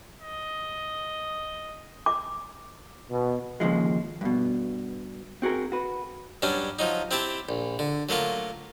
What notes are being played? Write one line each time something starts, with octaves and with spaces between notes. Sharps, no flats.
D#5
D6
B2
D#2 C#3 F3 G#3
G2 B2
C4 F#4 G#4 A#4
F#4 B4
G2 F#3 C#4 D4
F3 F#3 D#4
C4 E4 G4 A5
A#1
D3
F#3 A3 A#3 F4